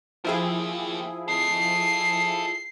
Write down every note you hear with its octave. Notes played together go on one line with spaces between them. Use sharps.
F3 A#3 E4 G4 G#4
A4 D#5 C7